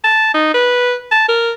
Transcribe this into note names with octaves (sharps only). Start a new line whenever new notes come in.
A5
D#4
B4
A5
A#4